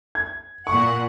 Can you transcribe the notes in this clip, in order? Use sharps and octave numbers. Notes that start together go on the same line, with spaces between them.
G#6
A#2 F#5 C#6